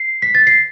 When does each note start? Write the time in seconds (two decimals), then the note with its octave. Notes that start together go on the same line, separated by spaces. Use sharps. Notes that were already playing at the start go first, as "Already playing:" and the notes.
Already playing: C7
0.22 B6
0.35 A6
0.47 C7